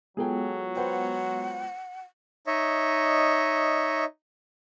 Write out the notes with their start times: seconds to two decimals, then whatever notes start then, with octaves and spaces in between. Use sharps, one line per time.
0.17 F#3 G#3 B3 F4 G#4 A4 G5
0.76 B4 C5 F#5 G5
2.47 D#4 C#5 D#5 E5